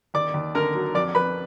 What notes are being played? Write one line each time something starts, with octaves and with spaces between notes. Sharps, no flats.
D#2 D5 D6
D#2
D3 A#4 A#5
F#3
F2 D5 D6
F2 B4 B5